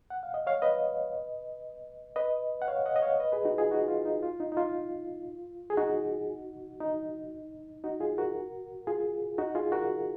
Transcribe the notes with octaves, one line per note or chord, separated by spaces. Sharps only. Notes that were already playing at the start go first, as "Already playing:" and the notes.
F#5
F5
D#5
C#5 F5
B4 D#5
B4 D#5
F#5
C#5 F5
D#5 F#5
D#5
C#5 F5
B4 D#5
G#4 B4
D#4 F#4
F4 G#4
D#4 F#4
F4
D#4
F4
D#4
D#4
F4
G#4
D#4 F#4
D#4
D#4 F#4
F4 G#4
F#4 A#4
F4 G#4
D#4 F#4
F4 G#4
F#4 A#4